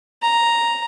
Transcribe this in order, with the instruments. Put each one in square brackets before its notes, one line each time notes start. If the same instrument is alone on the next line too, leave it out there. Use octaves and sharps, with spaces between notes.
[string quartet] A#5